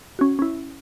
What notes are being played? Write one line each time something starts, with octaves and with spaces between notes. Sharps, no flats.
C#4 F#4
C#4 E4